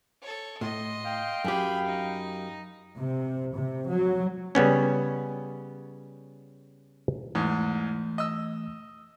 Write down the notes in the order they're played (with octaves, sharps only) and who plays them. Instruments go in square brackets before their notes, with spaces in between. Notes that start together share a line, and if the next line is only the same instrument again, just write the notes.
[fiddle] A4 C#5
[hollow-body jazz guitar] A2 [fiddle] D#5 C6
[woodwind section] F5 G5
[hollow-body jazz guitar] F#2 G4 [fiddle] G#4 B5
[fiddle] D#4
[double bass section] C3
C3
F#3
[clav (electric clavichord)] C#3 G3 B3 C#4
[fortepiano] E2 G#2 [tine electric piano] E3 A3
[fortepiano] D#5 E6